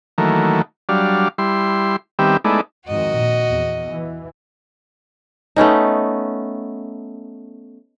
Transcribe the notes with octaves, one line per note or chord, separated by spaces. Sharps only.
D#3 E3 F#3 A3 A#3
F#3 G3 D4 F5
G3 E4 C6
D#3 G3 B3 C4 G4 E5
G#3 A3 B3 D#4 E4 D5
F2 G#2 D#3 F#4 D#5
A#2
E2
E3
A3 B3 C#4 D#4